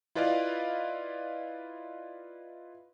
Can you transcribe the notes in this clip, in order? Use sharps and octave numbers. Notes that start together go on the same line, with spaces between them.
E4 F4 B4 D5 D#5 F5